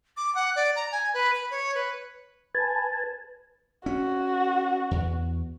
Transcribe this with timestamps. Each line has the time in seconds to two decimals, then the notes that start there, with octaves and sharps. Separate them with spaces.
0.17 D6
0.35 F#5
0.56 D5
0.76 A#5
0.92 G#5
1.14 B4
1.35 B5
1.50 C#5
1.75 B4
2.55 B4 G#5 A5
3.86 C#4 F#4
4.91 E2